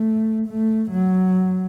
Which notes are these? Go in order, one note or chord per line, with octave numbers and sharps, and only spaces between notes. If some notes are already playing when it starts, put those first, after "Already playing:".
Already playing: A3
A3
F#3